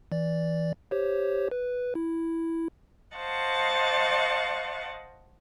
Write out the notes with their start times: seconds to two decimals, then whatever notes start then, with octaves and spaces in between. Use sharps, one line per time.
0.12 E3 D5
0.91 G4 C5 C#5
1.51 B4
1.95 E4
3.16 C5 D#5 F5 F#5 A5 C#6